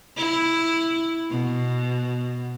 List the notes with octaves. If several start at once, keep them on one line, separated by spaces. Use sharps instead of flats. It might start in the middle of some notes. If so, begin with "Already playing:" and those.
E4
B2